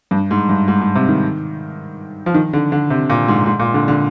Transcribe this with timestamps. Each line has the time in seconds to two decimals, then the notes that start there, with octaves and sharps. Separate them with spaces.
0.11 G2
0.31 G#2
0.49 G2
0.68 G#2
0.81 G#2
0.95 C3
1.08 D#3
2.26 F3
2.34 D#3
2.53 D3
2.72 D3
2.90 C3
3.10 A#2
3.28 G#2
3.46 G#2
3.60 A#2
3.74 D3
3.88 D3